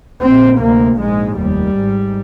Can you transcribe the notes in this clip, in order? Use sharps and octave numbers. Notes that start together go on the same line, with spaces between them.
A#1 A#2 C4
D2 C3 A#3
A#1 G#2 G#3
F1 D#2 G3
G#1 G#2